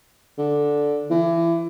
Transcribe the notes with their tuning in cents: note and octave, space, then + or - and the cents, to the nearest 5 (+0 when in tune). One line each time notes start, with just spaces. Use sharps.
D3 -5
E3 +30